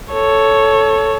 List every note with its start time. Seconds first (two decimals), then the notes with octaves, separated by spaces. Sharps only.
0.13 A4 C#5